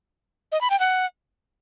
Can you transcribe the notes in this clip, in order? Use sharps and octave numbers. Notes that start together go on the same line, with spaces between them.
D#5
B5
G5
F#5